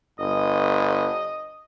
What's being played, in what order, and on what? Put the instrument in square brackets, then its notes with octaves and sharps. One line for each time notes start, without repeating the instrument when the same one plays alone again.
[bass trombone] G1 [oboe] D#5